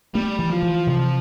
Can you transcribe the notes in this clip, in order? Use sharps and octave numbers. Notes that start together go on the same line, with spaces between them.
G3 A3
E3
F3
E3
C3